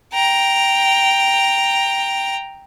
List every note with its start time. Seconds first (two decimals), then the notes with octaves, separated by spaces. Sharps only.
0.13 G5 A#5